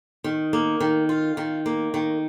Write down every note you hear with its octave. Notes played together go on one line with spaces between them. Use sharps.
D#3
A#3
D#3
F4
D#3
A#3
D#3